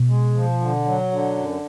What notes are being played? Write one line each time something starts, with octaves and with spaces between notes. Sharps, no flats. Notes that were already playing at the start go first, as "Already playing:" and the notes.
Already playing: B2
G#3
F3
D3
F#3
D3
F#2